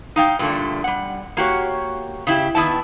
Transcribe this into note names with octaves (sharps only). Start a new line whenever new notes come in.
D#4 F5 G5
G2 A#2 D3 A3 D4
G3 F#5
A#3 F#4 G4 C#5
C#3 E4 G4
D#3 B3 E4 A5